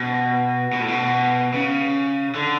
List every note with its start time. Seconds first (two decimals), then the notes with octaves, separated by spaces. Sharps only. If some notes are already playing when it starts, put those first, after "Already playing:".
Already playing: B2
0.73 B2
0.80 A2
0.88 B2
1.54 C#3
2.35 D3